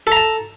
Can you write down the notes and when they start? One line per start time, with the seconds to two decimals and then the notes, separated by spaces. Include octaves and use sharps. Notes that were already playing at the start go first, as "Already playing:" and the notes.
0.07 A4
0.12 A#5
0.17 A5